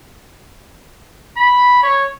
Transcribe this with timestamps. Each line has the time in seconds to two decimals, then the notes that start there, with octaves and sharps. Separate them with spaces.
1.37 B5
1.83 C#5